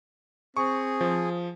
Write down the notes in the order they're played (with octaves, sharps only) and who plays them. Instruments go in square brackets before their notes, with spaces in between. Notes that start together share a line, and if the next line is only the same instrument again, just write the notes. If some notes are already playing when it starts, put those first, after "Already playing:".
[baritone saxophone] C4 [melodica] G#4 [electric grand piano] C#6
[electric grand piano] F3